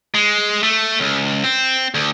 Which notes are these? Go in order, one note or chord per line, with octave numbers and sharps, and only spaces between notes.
G#3
A3
C#2
C4
D2